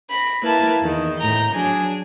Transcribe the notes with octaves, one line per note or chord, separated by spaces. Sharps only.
B5 A#6
A#3 E4 B4 A5
E2 D#3
A2 A#5 G6
F#3 D4 G#4